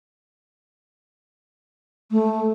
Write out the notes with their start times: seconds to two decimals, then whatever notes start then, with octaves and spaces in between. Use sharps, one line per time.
2.11 A3